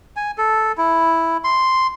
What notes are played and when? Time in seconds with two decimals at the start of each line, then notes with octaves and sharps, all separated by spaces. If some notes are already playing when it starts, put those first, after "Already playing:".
0.16 G#5
0.38 A4
0.78 E4
1.44 C6